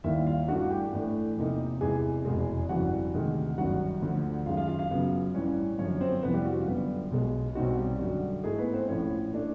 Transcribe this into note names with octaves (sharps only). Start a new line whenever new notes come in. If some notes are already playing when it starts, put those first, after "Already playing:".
D#2 D#3 G3 A#3 E4 E5
F4 F5
G2 E3 A3 D4 F#4 F#5
G4 G5
A2 E3 A3 D4
E2 C3 F3 A#3 D#4
E2 C3 E3 G#3 G#4 G#5
F1 E2 B2 G#3
G1 F2 C#3 E3 G3 F#4 F#5
D2 C3 D#3 G#3
G1 F#2 D#3 G3 F#4 F#5
D2 D3 F3
F#1 F#2 D#3 G#3 F4 F5
F4 F5
F4 F5
F4 F5
F#2 C#3 F#3 B3
A1 G2 E3 G3 C#4 C#5
F#2 D3 F3 C#4 C#5
C4 C5
F2 C3 E3 B3 B4
G3 G4
F#4
F4
F#2 D3 G3 B3
B1 B2 G#3
B1 B2 G3 C4 D#4 F#4
G3 G4
F#2 D3 G3 F#4
G#2 E3 G#3 A3 G#4
B3 B4
C4 C5
A#1 A2 F3 C#4 C#5
E3 A3 D4